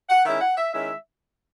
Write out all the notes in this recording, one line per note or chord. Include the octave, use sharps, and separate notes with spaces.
F#5
D#3 G#3 C#4 E4 E5
F#5
E5
D#3 G#3 C#4 E4 E5